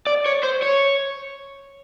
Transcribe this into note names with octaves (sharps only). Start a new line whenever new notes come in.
D5
C#5
C5
C#5